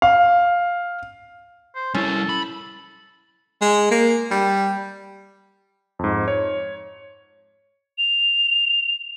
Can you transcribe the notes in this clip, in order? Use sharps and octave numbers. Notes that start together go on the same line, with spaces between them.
F5
C5
G3 C#4 E4 A4
B5
G#3
A#3
G3
F2 G#2
C#5
F7